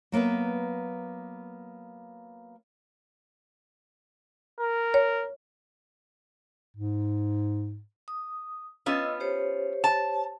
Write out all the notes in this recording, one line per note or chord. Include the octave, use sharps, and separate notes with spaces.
F#3 A#3 B3 B4 E5
A#4
C#5
G#2
D#6
B3 C#4 F4 D#5 E6
G4 C5 C#5
A5